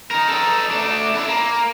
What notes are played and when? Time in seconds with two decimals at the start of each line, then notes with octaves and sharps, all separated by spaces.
0.11 D#4 A#4
0.29 D#4 A4
0.71 A3 D4
1.15 D4 E4
1.28 A#3